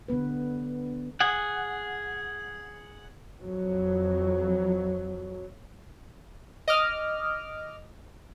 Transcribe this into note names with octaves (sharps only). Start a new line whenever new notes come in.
D3 G3 B3 B4
G#4 F#5
F2 F#3
D#5 D6 F6